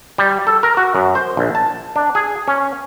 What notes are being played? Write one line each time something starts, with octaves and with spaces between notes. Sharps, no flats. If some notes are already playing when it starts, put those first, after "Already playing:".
G3
A4
A#4
F#4
F#2
C5
A#1
A5
D4
G#4
C#4